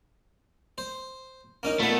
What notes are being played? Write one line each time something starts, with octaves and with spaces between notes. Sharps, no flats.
C5
A#3 C#4 D#4
A#2 A3 B3